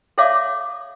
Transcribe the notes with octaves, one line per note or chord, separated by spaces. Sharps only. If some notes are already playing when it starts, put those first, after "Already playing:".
A4 C#5 D5 E5 F5 D6